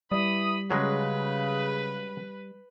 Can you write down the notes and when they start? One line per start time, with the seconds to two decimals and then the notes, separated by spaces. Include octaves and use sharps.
0.12 E3 G3 E4 B5 D#6
0.71 C#3 F#3 G#3 C#4 B4